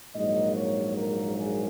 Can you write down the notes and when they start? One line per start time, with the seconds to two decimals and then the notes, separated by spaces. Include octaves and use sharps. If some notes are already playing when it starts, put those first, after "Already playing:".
0.15 A#1 G#2 F#3 A#3 D#5
0.57 C#5
0.98 A#4
1.38 G#4